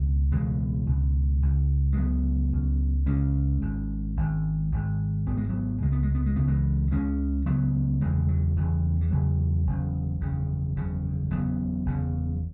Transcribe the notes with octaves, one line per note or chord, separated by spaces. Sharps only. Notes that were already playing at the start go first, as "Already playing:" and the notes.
Already playing: C#2 B2
C#2 B2 E3 G#3
C#2 B2
C#2 C#3
G#3
C#2 C#3 F#3 B3
C#2 C#3
C#2 C#3 G#3 C#4
G#1 G#2
G#1 G#2
G#1 G#2
G#1 G#2 B3
G#3
F#3 B3
C#2 C#3 G#3
B3
G#3
B3
G#3
C#2 C#3 B3
E3 G#3
C#2 C#3 G#3 C#4
C#2 C#3 F#3 B3
F#1 E2 C#3 E3 G#3
F#3
F#1 E2 C#3 E3
E3
F#1 E2 C#3 F#3
F#1 E2 C#3
F#1 E2 C#3
F#1 E2 C#3
F#1 E2 C#3 F#3 B3
F#1 E2 C#3